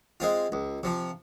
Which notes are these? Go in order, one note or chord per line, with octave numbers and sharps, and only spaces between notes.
G#3 C4 F4
C#2
C3 F3